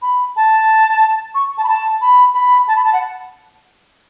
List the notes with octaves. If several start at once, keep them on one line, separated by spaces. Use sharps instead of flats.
B5
A5
C#6
A5
B5
A5
B5
B5
A5
B5
A5
F#5